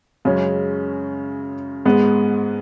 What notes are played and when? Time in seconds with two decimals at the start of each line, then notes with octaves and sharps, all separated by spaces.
0.25 F#2 C#3 G#3 C#4
1.86 G#2 G#3 B3